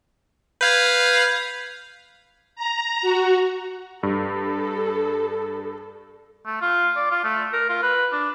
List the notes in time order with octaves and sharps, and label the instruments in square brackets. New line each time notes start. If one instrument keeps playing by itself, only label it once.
[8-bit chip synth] B4 F5 [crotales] G6 G#6
[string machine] A#5
F#4
[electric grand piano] G2 [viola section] A4
[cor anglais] A3
F4
D5
F4
A3
A#4
F4
B4
D4